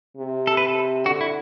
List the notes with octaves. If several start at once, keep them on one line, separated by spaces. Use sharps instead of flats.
C3
A4
B4
A4
D3 F#4
E4